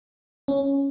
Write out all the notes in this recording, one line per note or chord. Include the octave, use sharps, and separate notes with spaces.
C#4